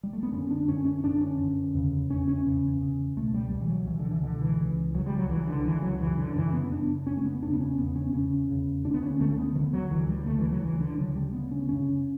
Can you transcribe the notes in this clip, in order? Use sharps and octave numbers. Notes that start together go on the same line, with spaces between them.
G3
A3
B3
F#2 D3 C#4
D4
F#2 D3 C#4
C#4
F#2 D3 D4
C#4
F#2 D3
E2 C#3
E2 C#3 C#4
C#4
E2 C#3
E2 C#3
C#2 B2 A3
G3
C#2 B2 G3
E3
F#3
C#2 B2 E3
D3
E3
C#2 B2 D3
E3
C#2 C#3
C#2 C#3 F#3
G3
F#3
C#2 C#3 E3
D3
C#2 C#3 E3
F#3
F#2 C#3 E3
D3
F#2 C#3 E3
B3
F#2 C#3 D4
F#2 C#3 C#4
A3
B3
E2 C#3 D4
B3
C#4
E2 C#3 B3
C#4
E2 C#3 C#4
E2 C#3
D2 D3 D4
B3
C#4
D2 D3 A3
C#4
B3
D2 D3 E3
F#3
D2 D3 E3
G3
D2 C#3 A3
E3
F#3
D2 C#3 E3
D3
D2 C#3 F#3
G3
D2 C#3 B3
C#4
F#2 C#3 C#4